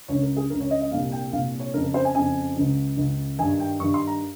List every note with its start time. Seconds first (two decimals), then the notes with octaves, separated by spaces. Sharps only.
0.08 C#2 C#3 C#5
0.22 A#4
0.36 G#4
0.50 C#3 A#4
0.54 C#2
0.60 C#5
0.71 D#5
0.81 D#5
0.91 C2 A#2 F5
1.12 G5
1.32 C2 F5
1.36 A#2
1.60 C#5
1.74 C#3 A#4
1.77 F2
1.84 A#4
1.94 C5
2.05 G#5
2.15 F2 C#3 G#5
2.56 C#2 C#3
2.97 C#2 C#3
3.39 G2 D#3 G#5
3.60 G5
3.80 G2 C#6
3.84 D#3
3.94 C6
4.07 A#5